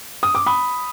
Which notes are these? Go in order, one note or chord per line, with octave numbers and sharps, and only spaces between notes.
D#6
D6
B5 D#6